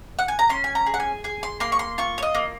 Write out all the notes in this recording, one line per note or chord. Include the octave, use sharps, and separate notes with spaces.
F#5
G#5
A#5
C#4 C6
G#5
A#5
G#4
F#5
G#5
G#4 G#5
C6
A#3 C6
C#6
C6
F4 C#6
C#5
D#5
A#3